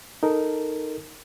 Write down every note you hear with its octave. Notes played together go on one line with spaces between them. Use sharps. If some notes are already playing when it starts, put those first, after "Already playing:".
D#4 A4 A#4